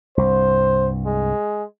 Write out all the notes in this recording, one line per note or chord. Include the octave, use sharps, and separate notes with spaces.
C2 G2 C5
G#3